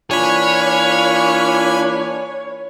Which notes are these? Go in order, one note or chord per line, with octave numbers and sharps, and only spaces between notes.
E3 A#3 D4 F4 C#5 G#5 B5